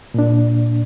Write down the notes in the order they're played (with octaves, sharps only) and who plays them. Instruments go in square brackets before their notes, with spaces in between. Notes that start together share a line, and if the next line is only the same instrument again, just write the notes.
[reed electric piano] A#2 D4